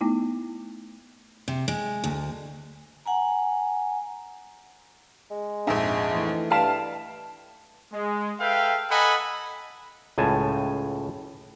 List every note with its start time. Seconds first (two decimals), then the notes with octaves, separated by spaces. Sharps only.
0.01 A3 B3 D#4 E4
1.48 C3
1.68 G#3
2.04 D2
3.06 F#5 G#5 A#5
5.31 G#3
5.67 A#1 F2 G#2 E5
6.14 E3 A3 D#4
6.51 G2 E5 F5 G5 A5 F6 E7
7.93 G#3
8.40 A4 B4 E5 F5 G5
8.90 A4 D#5 F#5 G#5 A#5 B5
10.18 C#2 A2 G#5 A5